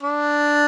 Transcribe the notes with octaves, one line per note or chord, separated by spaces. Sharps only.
D4